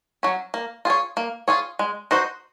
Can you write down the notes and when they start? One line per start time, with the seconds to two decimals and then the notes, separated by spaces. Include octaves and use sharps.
0.23 F#3 C#4
0.54 A#3
0.85 F4 G#4 C#5
1.17 A#3
1.48 F4 G#4 C#5
1.79 G#3
2.11 D#4 F#4 C5